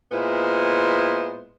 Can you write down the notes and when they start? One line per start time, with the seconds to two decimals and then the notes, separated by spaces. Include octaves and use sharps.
0.11 A#2 G#3 B3 E4 C5